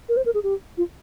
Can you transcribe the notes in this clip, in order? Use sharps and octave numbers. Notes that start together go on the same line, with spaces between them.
A#4
C5
A#4
G#4
G4
F4